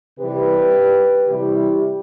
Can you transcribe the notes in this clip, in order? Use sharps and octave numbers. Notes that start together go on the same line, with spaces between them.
C3 E3 G3 G4 B4
C3 E3 G3 E4 G4